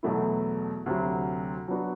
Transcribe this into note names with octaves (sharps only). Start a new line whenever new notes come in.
E2 B2 F#3 A3 E4
D2 C3 F#3
F#3 B3 D4 F#4